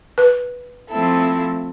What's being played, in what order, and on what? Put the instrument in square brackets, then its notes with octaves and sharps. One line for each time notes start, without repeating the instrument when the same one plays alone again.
[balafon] B4
[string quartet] F3 A3 C4 E4 A4